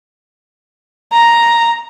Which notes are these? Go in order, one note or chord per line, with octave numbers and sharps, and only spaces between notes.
A#5